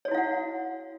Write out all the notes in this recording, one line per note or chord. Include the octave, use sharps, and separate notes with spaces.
E4 F#4 C#5 F5 F#5